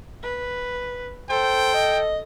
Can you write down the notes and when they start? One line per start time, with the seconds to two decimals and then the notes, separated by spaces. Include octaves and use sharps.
0.23 B4
1.30 A4 C5 G5
1.74 D#5